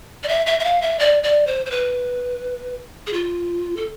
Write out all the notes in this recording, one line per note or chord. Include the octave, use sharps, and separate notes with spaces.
D5
E5
E5
E5
F5
E5
D5
D5
C5
C5
B4
G#4
F4
A4